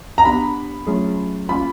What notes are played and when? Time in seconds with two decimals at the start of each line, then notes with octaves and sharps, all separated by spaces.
0.18 A#5
0.25 B3 D4 G4 B5
0.87 F#3 A3 C#4 F4 G#4
1.49 A#3 C#4 F4 B5